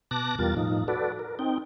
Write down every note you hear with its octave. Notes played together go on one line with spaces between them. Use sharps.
B2 A5 D6 F#6 A#6
E2 B2 G3 F4 A#4 A6
A2 F3 D#4
F#4 A4 B4 D5
A#4
C4 D#4 G5